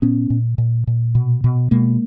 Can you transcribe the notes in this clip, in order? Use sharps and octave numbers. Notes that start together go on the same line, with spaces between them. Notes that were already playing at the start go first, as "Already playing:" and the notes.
A#2 B3 C#4
A#2
A#2
A#2
B2
B2
B2 G#3 A#3